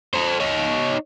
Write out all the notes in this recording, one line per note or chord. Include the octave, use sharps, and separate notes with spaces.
A4 C5
D#4 C#5